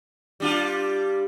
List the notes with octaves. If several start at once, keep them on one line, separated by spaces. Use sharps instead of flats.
G3 D4 F4